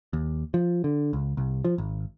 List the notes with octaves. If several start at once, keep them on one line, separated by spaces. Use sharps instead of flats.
D#2
F3
D3
C#2
C2
F3
G#1